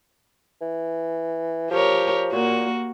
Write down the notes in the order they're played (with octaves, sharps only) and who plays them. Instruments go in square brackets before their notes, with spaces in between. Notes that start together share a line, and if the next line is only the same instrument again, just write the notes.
[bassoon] E3
[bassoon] F3 [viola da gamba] G4 A#4 C#5
[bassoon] A#2 [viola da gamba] A#3 F#4